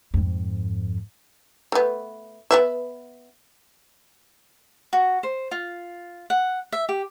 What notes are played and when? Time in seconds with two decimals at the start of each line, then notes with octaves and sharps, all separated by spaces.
0.14 F2 G#2
1.72 A3 B3
2.51 B3 B4 E5
4.93 F#4
5.23 C5
5.51 F4
6.30 F#5
6.72 E5
6.89 G4